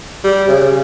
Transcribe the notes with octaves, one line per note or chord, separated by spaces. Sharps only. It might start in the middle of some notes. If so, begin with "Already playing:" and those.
G3
C#3